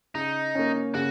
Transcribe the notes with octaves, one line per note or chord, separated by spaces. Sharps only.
C#3 D#4
A#3 C#4
C#3 F#4